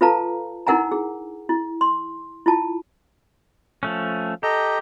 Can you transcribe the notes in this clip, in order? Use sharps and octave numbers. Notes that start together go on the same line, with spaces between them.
F4 A4 B4 F5 A5 A#5
D#4 E4 A#4 F#5 G#5 A#5
G#4
E4
C6
E4 F4 A5
F3 A3 C#4
G4 A4 D#5 A#5